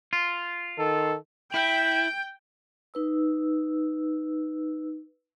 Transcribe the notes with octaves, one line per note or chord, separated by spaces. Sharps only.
F4
D#3 A4
E4 G5
D#4 B4 E6